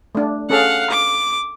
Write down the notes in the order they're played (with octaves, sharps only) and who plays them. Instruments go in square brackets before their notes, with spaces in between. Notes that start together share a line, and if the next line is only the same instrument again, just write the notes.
[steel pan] A3 D4
[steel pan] C#4 G#4 A4 [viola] F5 F#5
[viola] D6